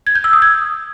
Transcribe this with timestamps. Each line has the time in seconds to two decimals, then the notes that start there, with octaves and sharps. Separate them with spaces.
0.07 G#6
0.15 G6
0.24 E6
0.33 D#6
0.42 G#6